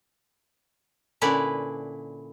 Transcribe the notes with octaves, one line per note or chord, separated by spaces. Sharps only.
A#2 D3 C#4 E4 B4 D5